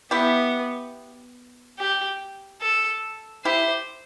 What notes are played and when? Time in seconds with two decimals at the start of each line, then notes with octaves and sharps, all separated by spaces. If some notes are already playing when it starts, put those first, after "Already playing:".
0.11 B3 E4 G4
1.78 G4
2.62 A4
3.45 E4 G4 C5